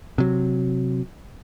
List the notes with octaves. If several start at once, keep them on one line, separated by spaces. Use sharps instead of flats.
C3 F#3